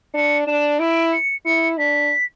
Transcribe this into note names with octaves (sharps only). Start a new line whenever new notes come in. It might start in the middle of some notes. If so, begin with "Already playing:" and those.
D4 C#7
D4 E7
E4 D7
C#7
E4 C#7
D4 B6